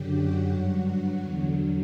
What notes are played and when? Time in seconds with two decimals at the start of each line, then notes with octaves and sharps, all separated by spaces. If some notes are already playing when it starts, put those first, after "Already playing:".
Already playing: F#2 D3 F#3 G4
0.15 F#4
0.51 G2 F#3
1.22 E2 D3 F#3